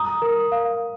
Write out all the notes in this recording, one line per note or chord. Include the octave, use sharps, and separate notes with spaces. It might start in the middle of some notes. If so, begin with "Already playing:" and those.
Already playing: A#5 D#6
A#4
F5